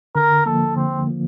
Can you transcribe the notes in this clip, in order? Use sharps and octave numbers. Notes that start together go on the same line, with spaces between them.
D3 A#4
F3 A#3 A4
D3 C4
F3 A#3